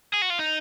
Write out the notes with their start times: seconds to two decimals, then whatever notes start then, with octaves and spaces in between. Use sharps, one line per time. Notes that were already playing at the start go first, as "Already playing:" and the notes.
0.14 G#4
0.22 F#4
0.30 F4
0.39 D#4